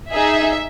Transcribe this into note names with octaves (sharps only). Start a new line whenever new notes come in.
D#4 G#4 E5